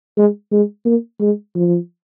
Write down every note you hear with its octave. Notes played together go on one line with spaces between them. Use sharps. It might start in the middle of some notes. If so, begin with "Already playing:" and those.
G#3
G#3
A#3
G#3
F3